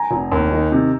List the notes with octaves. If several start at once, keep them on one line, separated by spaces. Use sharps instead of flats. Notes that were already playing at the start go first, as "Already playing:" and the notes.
Already playing: G#5 A#5
F1
D#2
D#3
C3